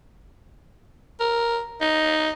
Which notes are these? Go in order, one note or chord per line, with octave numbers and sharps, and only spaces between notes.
A#4
D#4